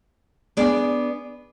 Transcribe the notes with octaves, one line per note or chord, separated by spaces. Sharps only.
B3 D4 G#4 D5